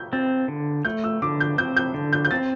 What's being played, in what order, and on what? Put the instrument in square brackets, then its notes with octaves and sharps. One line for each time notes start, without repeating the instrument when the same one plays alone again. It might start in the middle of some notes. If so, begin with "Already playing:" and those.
Already playing: [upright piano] E6 G6
[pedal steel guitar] C4 [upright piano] A6
[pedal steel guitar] D3
[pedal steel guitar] A3 [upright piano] G6
[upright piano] E6
[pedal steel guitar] D3 [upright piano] D6
[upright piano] G6
[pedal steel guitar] C4 [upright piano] G6
[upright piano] G6
[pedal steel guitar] D3
[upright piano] G6
G6
[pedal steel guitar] C4 [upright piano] A6